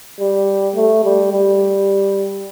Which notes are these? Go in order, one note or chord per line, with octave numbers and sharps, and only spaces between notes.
G3
A3
G3
G3